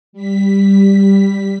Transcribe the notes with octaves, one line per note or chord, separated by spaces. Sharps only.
G3 B6